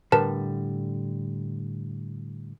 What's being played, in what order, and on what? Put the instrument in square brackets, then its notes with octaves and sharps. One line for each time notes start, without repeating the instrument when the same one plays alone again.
[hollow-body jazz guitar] A2 D3 G3 [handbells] A#4 B4 A5